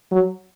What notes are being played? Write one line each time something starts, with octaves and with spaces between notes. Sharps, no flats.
F#3